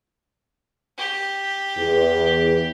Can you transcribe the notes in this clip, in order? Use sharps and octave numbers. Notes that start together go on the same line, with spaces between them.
G4
E2